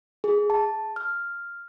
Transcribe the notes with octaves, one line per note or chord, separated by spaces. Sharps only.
G#4
A5
F6